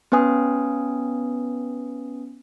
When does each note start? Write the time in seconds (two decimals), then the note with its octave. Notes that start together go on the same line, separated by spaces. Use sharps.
0.12 B3 C#4 B4 G#5 D#6